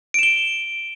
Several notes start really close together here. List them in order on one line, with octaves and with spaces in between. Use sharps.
D7 E7 G7